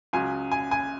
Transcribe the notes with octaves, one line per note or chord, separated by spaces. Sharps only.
C#2 C#3 F#3 G#5
G#5
G#5